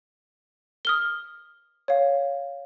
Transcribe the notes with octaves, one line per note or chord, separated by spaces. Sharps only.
D#6 F6 G7
C#5 F5